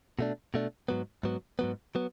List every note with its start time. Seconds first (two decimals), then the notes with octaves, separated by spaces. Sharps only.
0.19 B2 A3 D4
0.54 B2 A3 D4
0.88 G#2 F#3 B3
1.23 G#2 F#3 B3
1.59 G#2 F#3 B3
1.95 F#3 B3